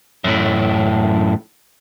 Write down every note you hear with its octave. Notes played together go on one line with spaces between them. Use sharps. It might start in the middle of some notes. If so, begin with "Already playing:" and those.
F#2 A2